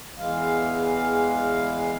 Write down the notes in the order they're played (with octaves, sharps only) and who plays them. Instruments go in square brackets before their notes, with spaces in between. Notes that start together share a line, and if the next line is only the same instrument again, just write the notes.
[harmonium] E2 E3 G#3 F5